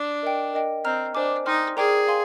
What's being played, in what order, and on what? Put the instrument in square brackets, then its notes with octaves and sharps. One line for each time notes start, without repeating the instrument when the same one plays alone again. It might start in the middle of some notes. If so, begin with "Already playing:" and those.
Already playing: [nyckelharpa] D4
[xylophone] A#4 D#5 G5
A#4 D#5 G5
[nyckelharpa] C4 [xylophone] D#5 A#5 F6
[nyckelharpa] D4 [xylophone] C5 D#5 G#5 D6
[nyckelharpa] D#4 [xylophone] D5 G5 C6 F6
[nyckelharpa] G#4 [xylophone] A#4 D5 G5 A#5 D6
[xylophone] F5 G#5 C6